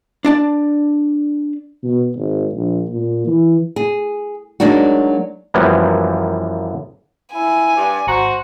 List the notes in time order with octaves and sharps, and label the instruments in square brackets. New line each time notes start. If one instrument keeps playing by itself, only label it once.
[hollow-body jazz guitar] D4 D5 A5
[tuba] B2
G#1
A#1
A#2
E3
[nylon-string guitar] G#4
F#3 G#3 A#3 D4 D#4 F#4
[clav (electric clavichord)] F#2 E3 F3 G3 A#3 B3
[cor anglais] E4 [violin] G#5
[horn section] G2 [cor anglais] D5
[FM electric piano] G#1 A#5 [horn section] F#4 [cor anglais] C5